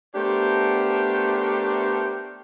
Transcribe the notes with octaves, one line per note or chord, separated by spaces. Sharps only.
A3 B3 D4 G4 A#4 C5